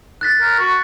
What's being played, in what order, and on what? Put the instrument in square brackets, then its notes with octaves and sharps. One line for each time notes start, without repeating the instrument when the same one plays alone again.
[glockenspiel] F#6 A6 B6
[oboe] A#4
F#4